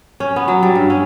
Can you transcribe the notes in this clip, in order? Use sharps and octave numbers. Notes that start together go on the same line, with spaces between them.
C#4
B3
F#3
G3
G2
C#4